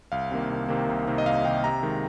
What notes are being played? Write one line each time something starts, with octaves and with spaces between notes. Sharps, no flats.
C2 F5
C3 D#3 A#3
C2
C3 D#3 A#3
C2
C3 D#3 A#3
D#5
C2 F5
C3 D#3 A#3 G5
C3 A#5
D#3 G#3